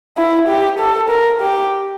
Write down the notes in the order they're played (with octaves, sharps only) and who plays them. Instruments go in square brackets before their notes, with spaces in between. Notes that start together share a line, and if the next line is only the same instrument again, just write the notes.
[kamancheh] E4
G4
A4
A#4
G4